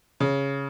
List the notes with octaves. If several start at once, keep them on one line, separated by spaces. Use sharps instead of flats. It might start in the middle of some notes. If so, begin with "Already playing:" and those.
C#3